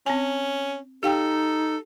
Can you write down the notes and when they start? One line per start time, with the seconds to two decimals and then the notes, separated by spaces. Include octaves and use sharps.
0.06 C4 C#4 G#5
1.03 D#4 G4 A4 F5 G5